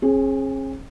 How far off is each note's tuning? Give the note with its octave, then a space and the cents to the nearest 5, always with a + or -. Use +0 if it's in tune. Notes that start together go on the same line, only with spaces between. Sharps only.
C#4 -45 G#4 +0